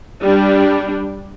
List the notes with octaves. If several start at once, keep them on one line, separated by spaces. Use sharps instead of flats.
G3 D4